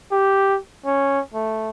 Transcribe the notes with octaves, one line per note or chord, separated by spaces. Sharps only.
G4
C#4
A3